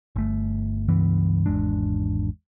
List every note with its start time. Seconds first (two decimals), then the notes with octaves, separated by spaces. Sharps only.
0.16 G1 A3
0.88 C#2 G2 E3 B3
1.46 G#1 E2 G#3 D4